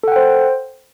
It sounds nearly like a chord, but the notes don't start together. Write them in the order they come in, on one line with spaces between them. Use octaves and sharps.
A4 F#5 G5 C5